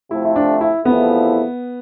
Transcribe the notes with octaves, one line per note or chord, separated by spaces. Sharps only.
C3 F3 A3 E4
E4
D4
E4
E2 C3 F3 A3 B3 E4